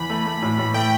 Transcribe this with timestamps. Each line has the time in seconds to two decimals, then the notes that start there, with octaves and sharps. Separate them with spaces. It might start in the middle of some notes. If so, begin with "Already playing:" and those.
Already playing: E2 B5
0.10 A3
0.26 A3
0.42 A2
0.59 A2
0.74 A3 G5